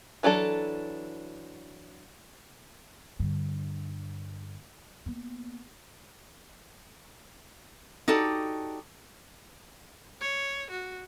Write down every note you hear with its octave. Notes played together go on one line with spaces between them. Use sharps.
E3 F#3 D4 A4
G2 D3
A#3 B3
D#4 F#4 G4 A4 D5
C#5
F#4